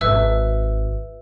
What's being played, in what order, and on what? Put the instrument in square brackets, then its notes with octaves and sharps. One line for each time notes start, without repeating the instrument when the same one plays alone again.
[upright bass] G#1 [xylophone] B4 E5 E6